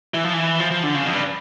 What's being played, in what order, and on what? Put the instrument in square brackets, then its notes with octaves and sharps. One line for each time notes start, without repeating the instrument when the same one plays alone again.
[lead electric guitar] E3
F3
E3
F3
F3
D3
C#3
F2
G2